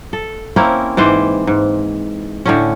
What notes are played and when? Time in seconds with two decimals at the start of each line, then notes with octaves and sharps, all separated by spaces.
0.13 A4
0.56 A#3 C4 C#4 E4
0.97 G#2 E3 C5 D5
1.47 G#2
2.46 A2 D3 C#4